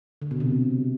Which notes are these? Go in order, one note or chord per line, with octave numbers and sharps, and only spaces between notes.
D3
B2
C3